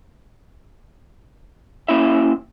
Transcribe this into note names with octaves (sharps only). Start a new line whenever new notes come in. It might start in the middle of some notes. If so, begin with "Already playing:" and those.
A#3 C#4 E4 E5